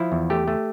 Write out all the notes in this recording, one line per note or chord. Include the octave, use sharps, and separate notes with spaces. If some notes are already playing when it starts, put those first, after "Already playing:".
Already playing: F3 E4
E2
A3 G4
A3